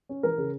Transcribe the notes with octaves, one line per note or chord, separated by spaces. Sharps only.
C#4
E3 A#4
C#3